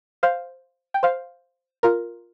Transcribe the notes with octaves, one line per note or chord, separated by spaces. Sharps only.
C5 F5
G5
C5 F5
F4 A#4